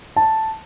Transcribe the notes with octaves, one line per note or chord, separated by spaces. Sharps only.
A5